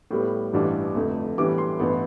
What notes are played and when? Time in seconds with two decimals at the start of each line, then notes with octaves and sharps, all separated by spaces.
0.11 A2 G3 B3
0.53 A1 G2 E3 G3 D4
0.95 F1 F2 D3 A3
1.38 A2 E3 G3 B3 D4 D6
1.58 C6
1.80 A1 G2 E3 B3